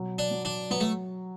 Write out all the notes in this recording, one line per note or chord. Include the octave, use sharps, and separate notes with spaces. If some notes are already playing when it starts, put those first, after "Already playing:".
Already playing: B2 F#3
D4
F#3
D4
F#3 B3
A3